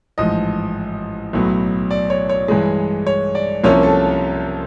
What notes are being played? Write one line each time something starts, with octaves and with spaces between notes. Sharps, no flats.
A1 G#2 F3 D#5
B1 A2 F#3 B3
D5
C#5
C#5
G2 E3 G#3
C#5
D5
C2 C3 F3 A#3 C#4 C#5
A4